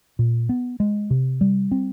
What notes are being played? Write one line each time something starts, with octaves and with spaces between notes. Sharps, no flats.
A#2
B3
G#3
C3
G3
C4